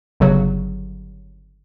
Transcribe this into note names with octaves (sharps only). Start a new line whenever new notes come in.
G1 C#3 F#3